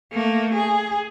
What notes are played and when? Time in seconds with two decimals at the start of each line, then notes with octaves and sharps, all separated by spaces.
0.12 A3 A#3
0.55 G#4